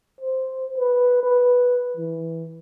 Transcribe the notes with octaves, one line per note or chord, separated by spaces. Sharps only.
C5
B4
B4
E3